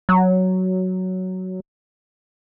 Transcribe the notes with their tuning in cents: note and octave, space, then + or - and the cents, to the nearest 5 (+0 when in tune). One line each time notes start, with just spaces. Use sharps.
F#3 +5